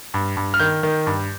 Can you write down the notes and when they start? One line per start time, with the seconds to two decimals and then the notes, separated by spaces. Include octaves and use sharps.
0.14 G2
0.37 G2
0.54 F6
0.59 D#3 G6
0.83 D#3
1.07 G2